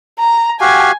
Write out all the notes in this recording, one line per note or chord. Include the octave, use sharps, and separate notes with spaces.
A#5
F#4 G4 F5 G#5